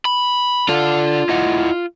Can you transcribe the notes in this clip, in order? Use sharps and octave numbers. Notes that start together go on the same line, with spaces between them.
B5
D4 F4 A4
E4 D#5 F#5